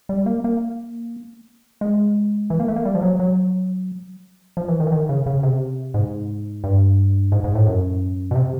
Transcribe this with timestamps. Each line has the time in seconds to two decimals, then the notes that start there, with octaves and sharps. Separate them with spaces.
0.09 G3
0.26 A#3
0.44 A#3
1.81 G#3
2.50 E3
2.60 A#3
2.68 A3
2.76 A#3
2.85 G3
2.95 F3
3.02 F#3
3.20 F#3
4.57 F3
4.68 E3
4.80 D#3
4.87 E3
4.92 D#3
5.09 C#3
5.26 C#3
5.43 C3
5.94 G#2
6.64 G2
7.32 G#2
7.44 G#2
7.55 A2
7.67 F#2
8.31 B2
8.36 C3